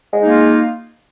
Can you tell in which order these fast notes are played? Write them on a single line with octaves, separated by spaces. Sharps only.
G#3 D#4 A#3 F4